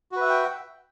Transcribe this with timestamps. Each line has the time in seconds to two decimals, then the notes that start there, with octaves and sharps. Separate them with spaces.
0.12 F#4
0.16 B4
0.21 E5
0.25 F#5
0.30 G5